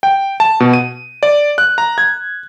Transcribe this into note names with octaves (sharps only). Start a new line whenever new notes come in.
G5
A5
B2
D#7
D5
F#6
A#5
G#6